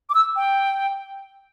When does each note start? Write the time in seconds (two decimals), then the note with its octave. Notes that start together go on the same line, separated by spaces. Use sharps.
0.09 D6
0.14 E6
0.36 G5